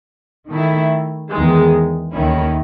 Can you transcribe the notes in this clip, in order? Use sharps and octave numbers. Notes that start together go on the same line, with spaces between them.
D#3 A3 E4
E2 D#3 G#3
D#2 D#3 A3 C#4 E4